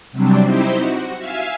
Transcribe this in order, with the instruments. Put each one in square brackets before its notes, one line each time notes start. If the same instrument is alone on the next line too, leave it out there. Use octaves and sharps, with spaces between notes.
[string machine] C3 F#3 G3 C4 D4
C4 D#4 E4 G4 C5
F#4
E5 F5 G#5